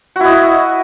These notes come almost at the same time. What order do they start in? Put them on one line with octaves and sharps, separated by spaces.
F#4 E4 D#5